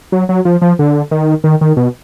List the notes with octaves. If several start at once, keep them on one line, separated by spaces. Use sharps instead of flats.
F#3
F#3
F3
F3
D3
D#3
D#3
D#3
B2